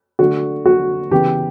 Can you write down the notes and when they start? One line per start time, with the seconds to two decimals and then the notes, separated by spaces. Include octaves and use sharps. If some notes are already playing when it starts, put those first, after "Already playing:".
0.19 D3 A3 F#4
0.66 F#4
1.11 C#3 E3 B3 G4